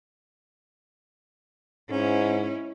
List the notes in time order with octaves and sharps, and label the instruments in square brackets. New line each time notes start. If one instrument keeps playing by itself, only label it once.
[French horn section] G#2 [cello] C#4 E4